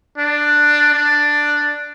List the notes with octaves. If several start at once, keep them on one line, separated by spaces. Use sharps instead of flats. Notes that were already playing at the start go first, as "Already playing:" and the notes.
D4
D4